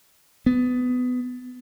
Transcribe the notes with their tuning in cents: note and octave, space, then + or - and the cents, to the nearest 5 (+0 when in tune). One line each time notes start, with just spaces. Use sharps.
B3 +20